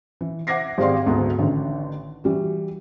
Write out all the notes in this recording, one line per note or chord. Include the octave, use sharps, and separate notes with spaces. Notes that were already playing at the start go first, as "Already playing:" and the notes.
E3
E5 F#5 D6 G#6 A#6 C7
G#1 G4 G#4 D5 F5 C6
D2 G#2 A3 B3 G#4
A1 D3 D#3
E3 G3 F#4